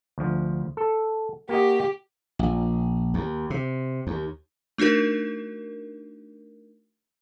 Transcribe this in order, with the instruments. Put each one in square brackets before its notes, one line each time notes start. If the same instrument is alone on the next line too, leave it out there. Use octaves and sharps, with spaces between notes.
[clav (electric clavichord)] D2 F3
A4
[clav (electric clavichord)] A#3 F#4 D#5 [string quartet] G4
[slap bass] A#1
D#2
C3
D#2
[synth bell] A3 D4 D#4 F#4 A#4